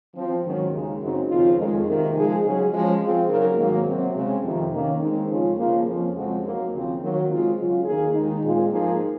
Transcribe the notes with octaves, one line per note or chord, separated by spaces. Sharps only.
F3 C4 F4
G#2 D#3 F#3 C#4
D#2 C#3 G#3 D#4
F#2 C#3 F#3 C4 D#4
D#2 C#3 F3 C4 F4
F2 D#3 G#3
C3 D#3 A#3 D#4 A#4
F3 G#3 D#4 G#4
C#3 F#3 C#4 G#4
F3 G#3 C#4
F3 C4 F4 G#4
C#3 F#3 A#3 D#4 A#4
G#2 D#3 F#3 A#3
C3 F#3 C4
C#3 G#3 C4
F2 C3 D#3
D#3 A#3 C#4
D#3 G#3 C4 D#4
F2 C#3 G#3 C#4 F4
C#3 F3 A#3
F2 C#3 F3
F2 C#3 G#3 C4 F#4
G#2 F#3 A#3
D#2 C#3 F3 C4
D#3 F#3 A#3
C#3 G#3 C4 F4
C#3 F#3 C#4 F4
D#2 D#3 A#3 D#4 G#4
D#2 D#3 G#3 D#4
A#2 G#3 C4 F4 G#4
G#2 F3 A#3 D#4 G#4